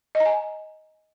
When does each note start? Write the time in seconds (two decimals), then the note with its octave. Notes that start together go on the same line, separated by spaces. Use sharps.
0.15 D#5
0.20 A#5
0.26 G#5